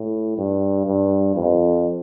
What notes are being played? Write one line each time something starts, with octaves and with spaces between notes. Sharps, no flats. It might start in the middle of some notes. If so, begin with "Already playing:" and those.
Already playing: A2
G2
G2
F2